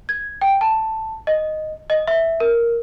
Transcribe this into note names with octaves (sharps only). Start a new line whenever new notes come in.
G#6
G5
A5
D#5
D#5
E5
A#4